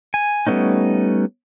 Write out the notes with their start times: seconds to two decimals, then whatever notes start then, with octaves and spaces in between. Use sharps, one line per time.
0.14 G#5
0.47 G3 A3 B3 C#4 D#4